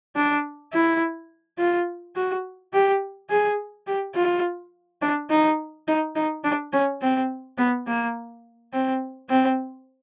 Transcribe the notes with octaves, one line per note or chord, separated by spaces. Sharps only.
D4
E4
F4
F#4
G4
G#4
G4
F4
D4
D#4
D#4
D#4
D4
C#4
C4
B3
A#3
C4
C4